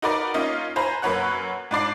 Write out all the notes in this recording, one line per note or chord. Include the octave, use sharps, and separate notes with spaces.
D#4 F#4 A#4 B4 D5
A#3 C#4 D#4 F4 D#5
B4 C5 G#5 A#5 B5
F#2 A#3 B4 C#5 F#5 F#6
G#2 D4 D5 C7